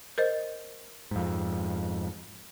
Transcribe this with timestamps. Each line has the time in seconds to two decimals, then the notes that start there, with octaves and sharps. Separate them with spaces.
0.18 A#4 C5 D#5
1.11 F2 G#2